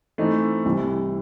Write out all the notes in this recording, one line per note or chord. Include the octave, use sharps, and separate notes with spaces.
E3 A3 C4 D#4
C2 C3 E3